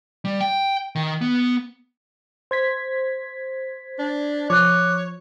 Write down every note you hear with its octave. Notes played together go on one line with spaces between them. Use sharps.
G3
G5
D#3
B3
C5 G#6 B6
D4
F3 C#5 D6 F#6